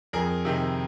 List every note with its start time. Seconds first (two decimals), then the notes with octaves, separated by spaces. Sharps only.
0.13 F2 G#4 A#4
0.45 C3 D#3